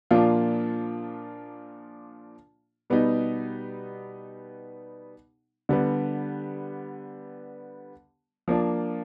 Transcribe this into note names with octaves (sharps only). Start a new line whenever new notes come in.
A#2 F3 A#3 D4 F4
B2 G3 B3 D#4
D3 G3 B3
F3 A#3 D4